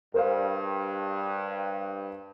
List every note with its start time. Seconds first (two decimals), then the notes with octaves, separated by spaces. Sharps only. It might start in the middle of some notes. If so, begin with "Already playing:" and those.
0.14 G2 A#4 C5 F5